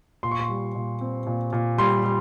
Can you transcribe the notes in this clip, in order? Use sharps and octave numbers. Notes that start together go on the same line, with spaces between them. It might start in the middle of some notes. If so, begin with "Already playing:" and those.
A#2 C6
C#6
C6
G3
A#2
C4
A#2
A#2
G3 C6
G3